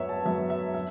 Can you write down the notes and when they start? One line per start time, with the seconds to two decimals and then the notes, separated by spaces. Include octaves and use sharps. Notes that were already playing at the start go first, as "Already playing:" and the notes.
Already playing: F#2 F#3 B3 C#5 E5
0.09 A5
0.26 F#2 F#3 B3 E5
0.50 E5
0.74 E5